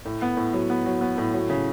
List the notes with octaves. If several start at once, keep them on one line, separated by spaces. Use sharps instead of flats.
A2
B3
A2
F#3
B3
F#3
B3
A2
F#3
C#3